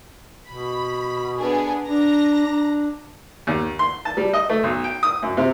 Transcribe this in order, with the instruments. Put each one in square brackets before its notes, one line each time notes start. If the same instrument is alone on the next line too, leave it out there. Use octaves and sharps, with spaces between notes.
[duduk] B2 [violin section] B5
[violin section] B3 D4 G#4
[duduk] D4 [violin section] A#5 A#6
[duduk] D4
[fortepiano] D#2
C6
A5
G3
D#5
A3
B1
G5
D#6
F#2
C3